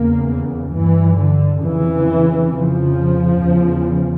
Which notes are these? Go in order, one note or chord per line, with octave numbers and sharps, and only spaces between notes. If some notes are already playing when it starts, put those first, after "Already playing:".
Already playing: E2 C#3 A#3
G2 E3
D3
F2 C#3 E3
F2 C#3 F3
E2 C#3